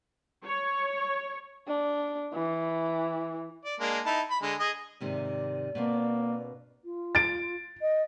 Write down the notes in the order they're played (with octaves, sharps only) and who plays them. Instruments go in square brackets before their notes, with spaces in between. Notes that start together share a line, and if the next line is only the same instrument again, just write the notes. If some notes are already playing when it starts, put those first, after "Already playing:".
[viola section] C#5
[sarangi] D4
E3
[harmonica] D5
G#3 A#3 D4
D#4 E4 A5
B5
D3 G#3
G#4 D#5
[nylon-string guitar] G#2 C3 D#3 [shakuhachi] D5
[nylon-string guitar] B2 C4 D4 [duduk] A#3
[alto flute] F4
[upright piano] A6 D7
[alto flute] D#5